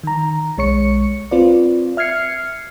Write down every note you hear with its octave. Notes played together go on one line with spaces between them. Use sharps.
D#3 A#5
B1 G#3 C#5 C#6 C#7
C4 F4 B4 D5
E5 F6 G#6 C7 C#7